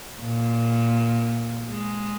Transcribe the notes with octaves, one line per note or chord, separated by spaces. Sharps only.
A#2
G#3